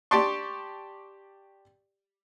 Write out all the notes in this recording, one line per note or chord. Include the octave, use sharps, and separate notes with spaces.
G4 D5 G5 A5 C6 C#6